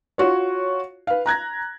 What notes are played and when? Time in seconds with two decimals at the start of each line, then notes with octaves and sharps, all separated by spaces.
0.18 F4 F#4 C#5
1.07 B4 F5
1.26 A#5 F#6 G#6 A#6